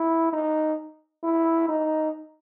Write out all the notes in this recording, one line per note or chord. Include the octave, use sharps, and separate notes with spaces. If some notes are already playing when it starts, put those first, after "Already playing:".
Already playing: E4
D#4
E4
D#4